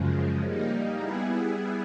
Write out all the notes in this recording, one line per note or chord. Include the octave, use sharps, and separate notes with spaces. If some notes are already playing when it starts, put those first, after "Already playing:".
Already playing: F#2 C#3 F3 G#3
G3 A#3 D#4
G3 B3 E4 G#4